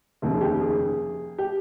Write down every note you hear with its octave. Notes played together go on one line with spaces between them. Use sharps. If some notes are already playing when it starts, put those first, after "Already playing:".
F1 D#2 C#3
G#4
G4
G#4
G4